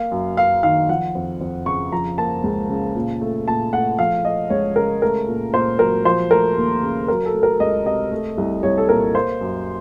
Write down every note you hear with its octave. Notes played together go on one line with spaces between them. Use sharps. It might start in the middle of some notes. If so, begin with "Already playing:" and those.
Already playing: A#3 F5
F#2
F#2 F5
D#3 F5
F3 F#5
F2
F2
C#3 C#6
F3 A#5
A#3 A5
C#2
C#3
A#2
A3
A#2 A5
A3 F#5
F3 F5
A3 D#5
C#2 C#5
C#3 A#4
A3 A#4
A#2
A#2 C5
F#3 A#4
F3 C5
A3 A#4
D#2
C#3
F#3 A#4
A4
A3
A#4
C#2 D#5
C3 D#5
A3
C2
C2 C#5
A4
A#2 A#4
A#3 C5
F#2